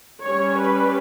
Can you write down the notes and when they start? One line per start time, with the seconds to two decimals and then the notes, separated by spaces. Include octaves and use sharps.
0.23 G3 C#4 C#5
0.59 B4